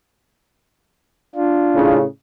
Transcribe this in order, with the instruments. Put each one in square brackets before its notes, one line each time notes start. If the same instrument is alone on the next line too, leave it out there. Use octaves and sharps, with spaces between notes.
[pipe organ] D4 F4
[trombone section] A2 C#3